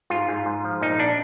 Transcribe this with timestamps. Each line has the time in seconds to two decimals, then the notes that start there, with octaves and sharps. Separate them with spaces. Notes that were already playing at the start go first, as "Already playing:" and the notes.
0.10 G#2 F4
0.28 G#2
0.46 G#2
0.64 F3
0.81 A#1 D#4
0.99 D4